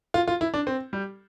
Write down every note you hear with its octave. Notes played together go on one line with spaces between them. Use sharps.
F4
F4
E4
D4
C4
G3